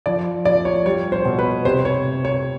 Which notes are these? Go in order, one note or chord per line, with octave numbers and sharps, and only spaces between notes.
F3 D5
F3 D5
C#5
G3 C#5
C5
B2
B4
C3 C5
C#5
C3
C#5